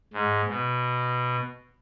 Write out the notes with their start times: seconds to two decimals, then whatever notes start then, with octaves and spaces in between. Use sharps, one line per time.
0.13 G#2
0.48 B2